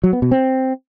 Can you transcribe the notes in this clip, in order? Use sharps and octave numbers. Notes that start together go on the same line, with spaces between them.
F#3
B3
B2
C4